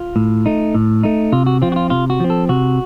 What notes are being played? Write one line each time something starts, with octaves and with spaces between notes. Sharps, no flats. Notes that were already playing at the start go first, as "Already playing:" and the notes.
Already playing: F4
A2
A3 D#4
A2
A3 D#4
C3 F4
F#4
F3 C4 F4
F#4
F4
C3 F4
F#4
F3 C4
A4
C3 F#4